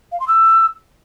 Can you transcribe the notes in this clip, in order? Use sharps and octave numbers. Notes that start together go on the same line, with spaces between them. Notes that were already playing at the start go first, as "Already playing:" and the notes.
F5
C6
E6